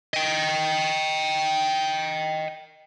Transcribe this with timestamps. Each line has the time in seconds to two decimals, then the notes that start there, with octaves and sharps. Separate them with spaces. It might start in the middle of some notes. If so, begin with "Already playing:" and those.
0.14 D#5 G5